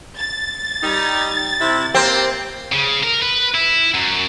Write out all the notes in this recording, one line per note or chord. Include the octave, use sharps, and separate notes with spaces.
A6
G3 D#4
C3 E4
A#3 C4 G4
C#3
A#4
B4
E4
F#2